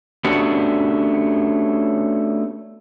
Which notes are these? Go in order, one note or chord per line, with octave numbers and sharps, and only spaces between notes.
A3 B3 C#4 D4 F#4 G4